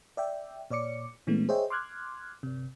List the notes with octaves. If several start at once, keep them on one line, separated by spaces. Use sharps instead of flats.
D5 E5 G5
A#2 C#5 D5 D6 C#7
A#2 E3 G#3 A3 B3 C#4
G#4 C5 C#5 D#5 E5 G5
C6 D6 F6 F#6 G#6
G1 C3